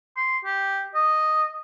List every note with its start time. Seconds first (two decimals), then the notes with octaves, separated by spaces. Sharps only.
0.16 C6
0.45 G4
0.95 D#5